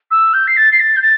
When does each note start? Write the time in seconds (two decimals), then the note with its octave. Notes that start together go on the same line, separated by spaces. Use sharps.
0.11 E6
0.34 G6
0.47 C7
0.57 A6
0.72 C7
0.80 A6
0.96 G6
1.02 A6